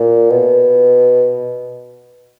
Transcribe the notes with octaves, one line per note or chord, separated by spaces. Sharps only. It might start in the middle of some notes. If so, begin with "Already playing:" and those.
Already playing: A#2
B2